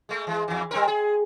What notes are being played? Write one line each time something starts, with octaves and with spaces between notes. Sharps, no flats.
G#3 A3
E3 G#3
E2 E3
G3 C4 A#4
G#4